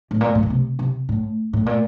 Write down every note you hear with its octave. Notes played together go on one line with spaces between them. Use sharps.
A2
A#2
A2
A#2
C3
C3
A2
A2
A#2